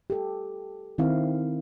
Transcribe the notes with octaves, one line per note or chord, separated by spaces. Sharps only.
G4 A4
D#3 C4 E4 F5